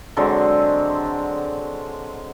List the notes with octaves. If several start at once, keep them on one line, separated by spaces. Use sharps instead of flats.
D3 F#3 G#3 C4